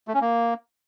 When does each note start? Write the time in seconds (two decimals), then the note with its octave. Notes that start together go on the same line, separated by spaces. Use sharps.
0.08 A3
0.14 C#4
0.21 A#3